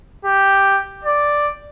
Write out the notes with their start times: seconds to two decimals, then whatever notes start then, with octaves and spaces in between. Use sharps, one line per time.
0.25 G4
1.04 D5